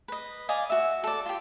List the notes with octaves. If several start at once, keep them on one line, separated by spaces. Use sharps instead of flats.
B4 D#5
D5 D#5 F5 G#5
F#4 E5
A4 D5
F4 G4